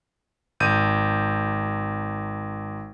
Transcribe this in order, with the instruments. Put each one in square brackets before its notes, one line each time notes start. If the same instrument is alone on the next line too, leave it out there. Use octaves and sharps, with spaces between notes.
[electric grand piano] G#1 G6 D#7